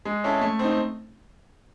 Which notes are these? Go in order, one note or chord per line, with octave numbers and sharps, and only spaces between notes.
G#3
C#4 E4 A4
A3
C4 D#4